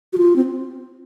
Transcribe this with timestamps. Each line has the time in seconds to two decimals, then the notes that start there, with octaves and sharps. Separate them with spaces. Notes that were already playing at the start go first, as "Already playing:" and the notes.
0.13 F#4
0.18 F4
0.36 C4